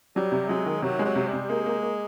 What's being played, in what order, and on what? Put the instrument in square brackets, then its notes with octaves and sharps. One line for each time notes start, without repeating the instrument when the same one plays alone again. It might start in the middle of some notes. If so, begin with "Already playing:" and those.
[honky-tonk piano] F#3 [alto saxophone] G3
[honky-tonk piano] C3
[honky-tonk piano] F#3 [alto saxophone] G#3
[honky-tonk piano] D#3
[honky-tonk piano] C3 [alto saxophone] F#3
[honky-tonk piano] G#3
[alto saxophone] F#3
[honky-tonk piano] C3
[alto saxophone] G3
[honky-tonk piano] C3
[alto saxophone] G#3 [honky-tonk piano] A#3
[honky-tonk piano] A#3
A#3